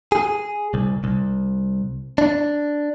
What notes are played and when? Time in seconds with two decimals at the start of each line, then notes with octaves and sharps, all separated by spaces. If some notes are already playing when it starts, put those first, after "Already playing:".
0.12 G#4
0.74 C2
1.04 C2
2.18 D4